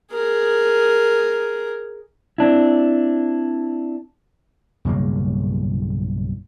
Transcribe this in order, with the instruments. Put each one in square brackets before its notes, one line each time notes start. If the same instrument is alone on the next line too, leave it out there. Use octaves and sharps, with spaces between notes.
[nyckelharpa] G#4 A#4
[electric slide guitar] C4 D4 E4
[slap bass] B1 G2 C#3 A#3